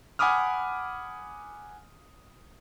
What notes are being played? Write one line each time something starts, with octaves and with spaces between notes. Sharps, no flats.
F#5 G#5 B5 D6 D#6 F6